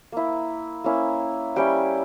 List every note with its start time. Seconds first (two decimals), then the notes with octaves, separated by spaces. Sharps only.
0.12 A#3 E4
0.84 A#3 C#4 E4
1.56 G3 C#4 E4 G5